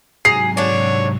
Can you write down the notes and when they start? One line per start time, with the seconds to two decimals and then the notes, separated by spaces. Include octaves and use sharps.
0.25 G#2 C3 F#3 G#4 A#5 C7
0.57 D3 D4 C#5